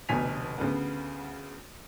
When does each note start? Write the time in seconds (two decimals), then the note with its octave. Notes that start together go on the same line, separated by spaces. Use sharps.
0.09 F1 D2 B2 G#5 B6 F7
0.58 D2 C#3 B3